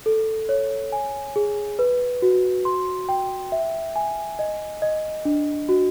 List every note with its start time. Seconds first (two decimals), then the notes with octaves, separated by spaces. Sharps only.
0.06 A4
0.49 C#5
0.92 G#5
1.36 G#4
1.79 B4
2.22 F#4
2.65 C6
3.09 G5
3.52 E5
3.96 G#5
4.39 D#5
4.82 D#5
5.25 D4
5.69 F#4